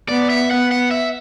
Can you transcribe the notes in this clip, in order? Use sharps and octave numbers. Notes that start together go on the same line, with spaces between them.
B3 D5
E5
B3 F#5
F#5
E5